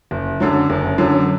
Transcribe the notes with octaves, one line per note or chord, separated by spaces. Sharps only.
F#1
F#2 D3 F#3
F#1
F#2 D3 F#3